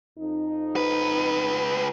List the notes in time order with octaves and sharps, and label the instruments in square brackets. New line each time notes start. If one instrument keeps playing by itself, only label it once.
[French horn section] F2 D#4
[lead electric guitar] C#2 B4